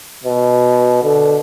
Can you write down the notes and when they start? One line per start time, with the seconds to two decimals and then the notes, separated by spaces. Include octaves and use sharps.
0.24 B2
1.04 D3